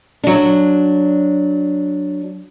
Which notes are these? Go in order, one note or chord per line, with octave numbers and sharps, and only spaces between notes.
F#3 D4